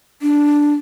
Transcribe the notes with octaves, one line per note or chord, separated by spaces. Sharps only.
D4